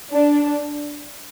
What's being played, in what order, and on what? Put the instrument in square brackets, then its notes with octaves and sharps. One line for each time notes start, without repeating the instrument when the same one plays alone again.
[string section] D4